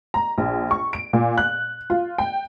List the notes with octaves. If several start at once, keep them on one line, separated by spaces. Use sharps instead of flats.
A#5
A#1
C#6
D7
A#2
F#6
F4
G5